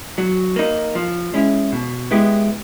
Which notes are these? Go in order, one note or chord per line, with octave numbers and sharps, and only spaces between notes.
F#3
A#3 D#4
F3
G#3 C#4 E4
B2
G#3 B3 E4 G4